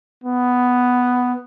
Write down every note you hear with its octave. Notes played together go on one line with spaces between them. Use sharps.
B3